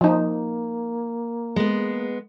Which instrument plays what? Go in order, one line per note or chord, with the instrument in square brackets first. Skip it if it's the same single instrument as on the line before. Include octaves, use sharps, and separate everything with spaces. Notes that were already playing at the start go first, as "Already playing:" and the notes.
[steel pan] F3 D#4 [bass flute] A#3
[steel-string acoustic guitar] G#3 B3